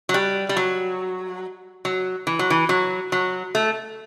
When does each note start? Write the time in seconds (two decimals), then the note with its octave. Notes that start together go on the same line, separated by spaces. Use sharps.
0.09 F#3
0.14 G3
0.49 G3
0.57 F#3
1.85 F#3
2.27 E3
2.39 F#3
2.50 E3
2.69 F#3
3.12 F#3
3.55 A3